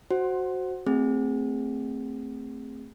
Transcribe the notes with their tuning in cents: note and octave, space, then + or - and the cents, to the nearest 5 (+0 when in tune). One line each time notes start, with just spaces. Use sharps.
F#4 +0 C5 +5
A3 +20 C4 +0 G#4 -20